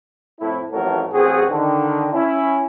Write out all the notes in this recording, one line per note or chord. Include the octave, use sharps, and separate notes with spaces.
F2 A2 C4 E4
A1 F2 A2 F#3 A4 A#4
A1 F#2 C4 F#4 G#4
D3 D#3
C#4 E4